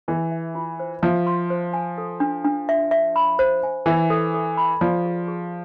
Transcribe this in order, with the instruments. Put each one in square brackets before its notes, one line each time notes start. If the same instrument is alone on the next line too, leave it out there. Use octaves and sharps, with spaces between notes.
[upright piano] E3 [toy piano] G#4
[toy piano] E5
F4
C5
[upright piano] F3 [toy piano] E5
[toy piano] C6
C5
G#5
A4
D4
D4
E5
E5
B5
C5
G#5
[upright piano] E3 [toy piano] E5
[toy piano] A4
A4
B5
[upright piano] F3 [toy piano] D5
[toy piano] G#4
G#4